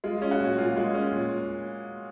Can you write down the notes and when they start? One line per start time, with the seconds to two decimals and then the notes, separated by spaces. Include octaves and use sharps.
0.04 G#3 F4
0.22 C#4
0.31 F#4
0.40 A#2
0.58 A#2 F4
0.76 G#3
0.94 C#4
1.12 A#2